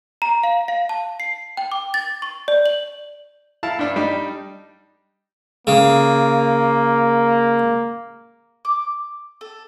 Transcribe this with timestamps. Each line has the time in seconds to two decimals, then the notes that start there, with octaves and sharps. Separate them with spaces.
0.22 A#5
0.43 F5
0.68 F5
0.89 A5
1.20 C7
1.57 G5
1.72 D6
1.94 A6
2.22 C#6
2.48 D5
2.66 F#7
3.63 E4 F5 A5
3.79 G2 D4
3.96 G3 D4 D#4
5.67 C#3 A#3
8.65 D6
9.41 A4